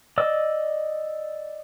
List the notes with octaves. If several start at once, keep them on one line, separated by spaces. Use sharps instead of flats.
D5 D#5 E6